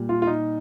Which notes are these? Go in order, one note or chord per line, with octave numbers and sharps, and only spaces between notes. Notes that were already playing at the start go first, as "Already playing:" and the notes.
Already playing: A#2 G3
F4
F4
D#4